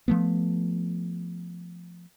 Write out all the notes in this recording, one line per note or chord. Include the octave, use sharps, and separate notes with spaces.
F3 A3 B3